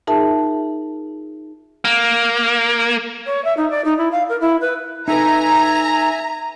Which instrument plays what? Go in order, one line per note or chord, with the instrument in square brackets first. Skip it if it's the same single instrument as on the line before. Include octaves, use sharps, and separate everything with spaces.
[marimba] D#4 F4 G#4 A#4 E5 A5
[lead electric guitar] A#3
[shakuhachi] C#5
E5
D#4
D5
D#4
E4
F5
A#4
E4
B4
[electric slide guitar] D#4 A4 B4 [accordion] E5 G#5 [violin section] A#5